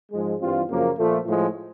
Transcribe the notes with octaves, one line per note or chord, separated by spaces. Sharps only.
G#2 F3 G#3
G2 E3 G3 C4 F4
F#2 C#3 F3 A#3
A#2 F3 A3
A2 F3 G#3